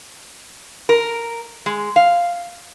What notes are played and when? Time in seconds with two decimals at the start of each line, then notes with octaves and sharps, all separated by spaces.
0.89 A#4
1.66 G#3
1.96 F5